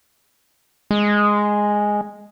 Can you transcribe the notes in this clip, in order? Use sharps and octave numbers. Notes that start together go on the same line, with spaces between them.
G#3